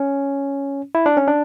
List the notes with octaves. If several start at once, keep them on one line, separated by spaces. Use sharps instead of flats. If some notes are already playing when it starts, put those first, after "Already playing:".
Already playing: C#4
E4
D4
C#4
D4